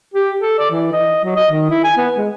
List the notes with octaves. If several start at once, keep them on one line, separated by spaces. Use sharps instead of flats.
G4
A4
D5
E3
D#5
F#3
D#5
D#3
E4
G#5
B3
G#3